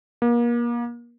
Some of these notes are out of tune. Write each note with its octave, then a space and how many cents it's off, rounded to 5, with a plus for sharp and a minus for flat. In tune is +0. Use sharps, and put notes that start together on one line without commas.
A#3 +35